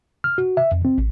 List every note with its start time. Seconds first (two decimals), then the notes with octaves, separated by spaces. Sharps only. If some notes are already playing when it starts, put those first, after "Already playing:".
0.24 F6
0.38 F#4
0.57 E5
0.72 F2
0.85 C4
0.98 A1